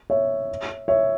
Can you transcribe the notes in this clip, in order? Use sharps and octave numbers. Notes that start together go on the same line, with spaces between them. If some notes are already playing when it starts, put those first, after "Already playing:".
C#5 E5
C#5 E5